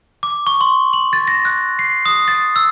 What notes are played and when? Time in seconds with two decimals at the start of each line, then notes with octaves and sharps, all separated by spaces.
0.23 D6
0.47 C#6
0.61 C6
0.93 F#7
1.13 A6
1.28 A#6
1.45 F#6
1.79 C7
2.06 D#6
2.28 A6
2.56 E6